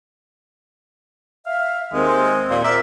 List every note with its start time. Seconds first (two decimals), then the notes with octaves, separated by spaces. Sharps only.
1.46 E5 F5
1.93 D#2 D#3 G#3 C4
2.49 D#2 A#2 C5
2.64 A#4 D5 E5